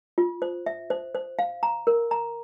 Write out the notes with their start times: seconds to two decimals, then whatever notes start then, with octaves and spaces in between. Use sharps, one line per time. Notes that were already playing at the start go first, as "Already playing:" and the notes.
0.18 F4
0.42 C5
0.66 E5
0.90 C5
1.15 C5
1.39 F5
1.63 A#5
1.87 A#4
2.11 A#5